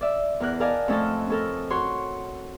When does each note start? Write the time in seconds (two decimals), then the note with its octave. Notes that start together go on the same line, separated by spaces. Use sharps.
0.01 D5 E5
0.40 E2 A#4 F#6
0.60 A#4 D5 D#5 F5 G#5 A5
0.88 F2 A3 C#4 A4 A#4 A5
1.30 C#4 A4 A#4
1.70 F#4 C#5 C6